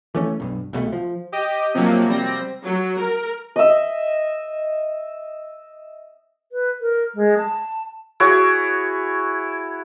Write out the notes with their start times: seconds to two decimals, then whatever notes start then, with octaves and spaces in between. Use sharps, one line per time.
0.15 E3 A3 C#4
0.40 B1 G2
0.73 C2 B2 G#3 A3
0.93 F3
1.32 G4 D#5
1.74 C3 F3 F#3 A#3
2.09 G3 C4 A#6
2.64 F#3
2.99 A#4
3.56 D#5 E5
6.52 B4
6.81 A#4
7.15 G#3
7.38 A5
8.20 E4 F#4 G#4 C#5